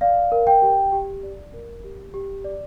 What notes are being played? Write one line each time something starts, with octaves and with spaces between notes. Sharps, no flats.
D5 F5
A#4
G5
G4
G4
D5
A#4
G4
G4
D5